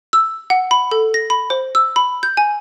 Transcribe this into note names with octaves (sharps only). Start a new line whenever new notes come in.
E6
F#5
B5
A4
A#6
B5
C5
E6
B5
G6
G#5